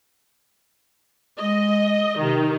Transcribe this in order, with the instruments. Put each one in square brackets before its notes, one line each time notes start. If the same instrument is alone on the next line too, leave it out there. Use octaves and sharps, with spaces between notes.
[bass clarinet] G#3 [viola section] D#5
[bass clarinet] C3 [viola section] D#3